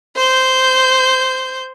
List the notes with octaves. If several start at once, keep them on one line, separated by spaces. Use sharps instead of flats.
C5 G6